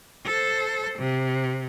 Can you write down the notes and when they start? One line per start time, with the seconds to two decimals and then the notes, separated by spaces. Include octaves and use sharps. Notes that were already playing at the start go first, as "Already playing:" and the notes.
0.25 A4 C5
0.99 C3